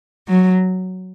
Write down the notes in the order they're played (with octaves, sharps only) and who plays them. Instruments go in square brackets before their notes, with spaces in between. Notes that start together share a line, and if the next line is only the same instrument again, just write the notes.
[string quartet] F#3